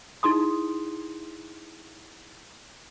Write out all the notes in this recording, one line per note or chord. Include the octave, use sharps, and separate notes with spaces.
D#4 E4 G#4 C6 D#6